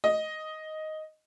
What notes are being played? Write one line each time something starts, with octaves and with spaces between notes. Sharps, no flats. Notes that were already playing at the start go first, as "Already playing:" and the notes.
D#5